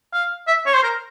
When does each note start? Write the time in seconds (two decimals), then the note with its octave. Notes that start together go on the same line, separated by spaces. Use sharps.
0.13 F5
0.47 E5
0.66 C#5
0.75 C5
0.83 A#4